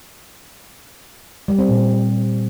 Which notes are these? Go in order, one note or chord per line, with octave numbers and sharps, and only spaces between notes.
G3
C4
A#2